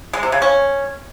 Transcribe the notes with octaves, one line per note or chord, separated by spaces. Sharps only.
G#3
C3
C#3
C#4